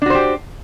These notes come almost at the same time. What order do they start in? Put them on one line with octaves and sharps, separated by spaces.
D4 F#4 C5 G4